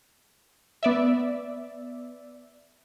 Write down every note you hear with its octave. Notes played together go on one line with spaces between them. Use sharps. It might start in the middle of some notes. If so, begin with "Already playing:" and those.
B3 D5 E5